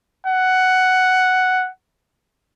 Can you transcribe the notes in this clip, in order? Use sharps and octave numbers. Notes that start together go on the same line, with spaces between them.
F#5